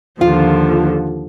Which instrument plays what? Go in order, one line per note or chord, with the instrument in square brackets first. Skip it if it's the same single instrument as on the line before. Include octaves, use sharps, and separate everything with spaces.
[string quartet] D#2 D3 F3 [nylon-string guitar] F4